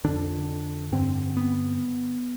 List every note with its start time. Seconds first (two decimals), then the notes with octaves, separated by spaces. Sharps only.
0.04 F2 D3 D4
0.92 G2 D3 C4
1.37 B3